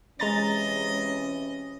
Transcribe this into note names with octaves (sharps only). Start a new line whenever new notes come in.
C3 E3 G#3 C#4 D#5 A#5 A6